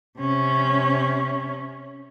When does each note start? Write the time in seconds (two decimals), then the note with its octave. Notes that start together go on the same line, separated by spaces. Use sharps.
0.19 C3 C#4